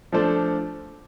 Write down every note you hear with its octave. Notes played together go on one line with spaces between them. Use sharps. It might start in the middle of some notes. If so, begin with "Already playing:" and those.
F3 A3 D4 A4 C5